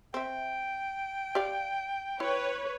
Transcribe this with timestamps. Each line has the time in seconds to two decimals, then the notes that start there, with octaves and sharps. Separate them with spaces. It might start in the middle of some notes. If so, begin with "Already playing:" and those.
0.14 C4 E5 G5
1.35 G4 D5 F5
2.20 E4 B4 C#5